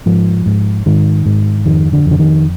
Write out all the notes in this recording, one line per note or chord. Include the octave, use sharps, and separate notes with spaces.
G#2 F3
G#2
G#2 D#3
G#2
F2 D#3
D3
F2
D3
D#3